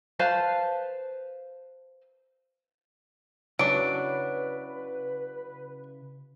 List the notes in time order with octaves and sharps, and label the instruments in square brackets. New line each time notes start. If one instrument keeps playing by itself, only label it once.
[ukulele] B4 C5 F5 A5
[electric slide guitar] C#3 E4 [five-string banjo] F#3 D4 [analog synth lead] B4 [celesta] D7